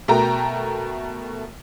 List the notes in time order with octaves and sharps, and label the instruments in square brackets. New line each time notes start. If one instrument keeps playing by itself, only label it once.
[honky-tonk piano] B2 A3 A#4 G5 A#5